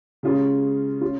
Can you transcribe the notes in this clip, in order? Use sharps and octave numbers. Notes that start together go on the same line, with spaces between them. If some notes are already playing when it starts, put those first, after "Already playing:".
C#3 G#3 C#4 F4 G#4
C#4 F4